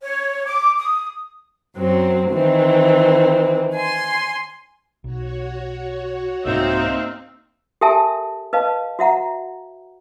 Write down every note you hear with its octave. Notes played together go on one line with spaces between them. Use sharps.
C#5
D6
D#6
F#2 F#3 C4
D#3 E3 C4
G#5 C6
B1 F#4 C#5
C2 G#2 A#3 C4 D#4 E5 F5 E6
G4 A4 A#4 E5 G#5 A5
B4 D#5 F5 A5
F#4 E5 F#5 A#5